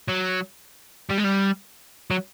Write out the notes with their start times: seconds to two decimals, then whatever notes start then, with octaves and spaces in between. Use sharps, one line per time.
0.08 F#3
1.09 G3
1.18 G#3
1.24 G3
2.11 F#3